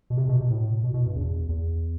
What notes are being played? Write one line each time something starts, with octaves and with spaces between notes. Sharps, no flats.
B2
C3
B2
B2
A2
B2
B2
G2
E2
E2